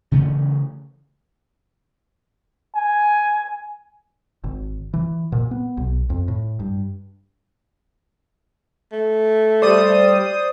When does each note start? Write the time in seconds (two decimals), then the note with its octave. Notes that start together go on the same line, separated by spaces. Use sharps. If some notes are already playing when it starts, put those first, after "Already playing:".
0.12 C#3 E3 A3 C#4
2.75 G#5
4.44 G#1
4.93 E3
5.32 A#2
5.51 B3
5.77 B1
6.10 F2
6.28 A2
6.60 G2
8.93 A3
9.62 G3 C5 D5 D#6